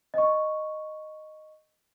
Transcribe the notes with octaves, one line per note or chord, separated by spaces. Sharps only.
D#5 C#6